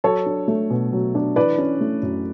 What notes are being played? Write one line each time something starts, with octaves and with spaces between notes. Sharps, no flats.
F#3 A4 C#5
D4
A3
B2
F#3
D4
E3 B4 D5
C#4
A3
F#2